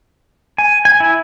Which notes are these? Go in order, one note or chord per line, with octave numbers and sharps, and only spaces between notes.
G#5
G#5
E4